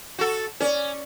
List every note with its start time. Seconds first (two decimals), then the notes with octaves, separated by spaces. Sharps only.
0.19 F#4 A4
0.60 C#4 D5